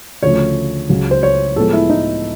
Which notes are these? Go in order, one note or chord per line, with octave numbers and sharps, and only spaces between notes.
D2 C#3 F3 A3 C#5
C#2 C#3 F#3
C5
C#5
A2 F3 G#3 B3 A4
E4
D#4